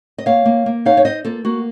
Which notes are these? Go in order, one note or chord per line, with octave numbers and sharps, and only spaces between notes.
D#5
A#3 C#5 F5
A#3
A#3
D#4 C#5 F5
C#5
D#4 C5 D#5
A#3 F4 A4
A#3 F#4